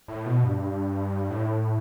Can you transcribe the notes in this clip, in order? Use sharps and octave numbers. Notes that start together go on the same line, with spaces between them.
A2
B2
G2
A2